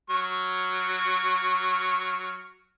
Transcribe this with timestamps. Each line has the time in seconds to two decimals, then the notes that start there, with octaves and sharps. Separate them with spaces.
0.10 F#3 C#6 F6